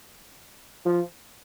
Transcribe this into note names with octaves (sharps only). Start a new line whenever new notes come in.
F3